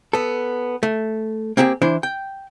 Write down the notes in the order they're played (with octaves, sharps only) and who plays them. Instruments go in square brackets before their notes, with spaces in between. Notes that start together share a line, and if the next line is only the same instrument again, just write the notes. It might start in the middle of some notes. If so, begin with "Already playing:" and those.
[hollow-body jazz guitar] B3 A4
A3
A#3 C4 E4 G4 G#4
E3 D4 E4 C5
G5